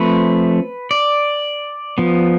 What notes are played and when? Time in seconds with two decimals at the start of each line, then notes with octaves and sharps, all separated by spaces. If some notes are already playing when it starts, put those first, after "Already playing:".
Already playing: F3 A3 C4 B4
0.91 D5
1.98 F3 B3